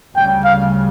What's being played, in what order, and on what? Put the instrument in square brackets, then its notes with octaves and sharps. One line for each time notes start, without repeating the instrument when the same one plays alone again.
[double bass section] D2 C#3 G3 [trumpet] G5
[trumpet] F5